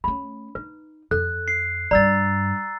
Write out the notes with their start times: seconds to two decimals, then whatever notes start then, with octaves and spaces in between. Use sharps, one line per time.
0.04 A3 C#4 B5
0.55 D#4 B4
1.11 F2 A4 F#6
1.48 C7
1.91 G2 G3 D5 A#5 E6 A6